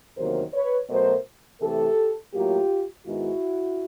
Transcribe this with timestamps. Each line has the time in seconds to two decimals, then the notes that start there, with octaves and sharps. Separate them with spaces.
0.17 E2 C3 D#3 F#3 A#3 A#4 C5
0.53 B4 C#5
0.89 B2 F#3 A3 A#4 C5
1.61 C3 E3 A3 G4 A4
2.33 A2 F#3 A#3 F4 G4
3.05 G#2 D#3 G#3 B3 E4 F#4